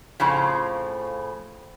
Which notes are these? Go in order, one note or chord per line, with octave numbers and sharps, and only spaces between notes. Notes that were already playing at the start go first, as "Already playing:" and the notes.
F2 A2 C#3 F3